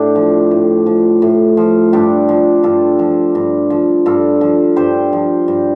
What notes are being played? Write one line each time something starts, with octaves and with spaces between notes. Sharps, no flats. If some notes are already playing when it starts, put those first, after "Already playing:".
Already playing: A2 D4 G4
F3
A2
F3
A2
F3
G2 D4 G4
F3
G2 F4 A4
F3
G2
F3
G2 F4 A4
F3
G2 G4 C5
F3
G2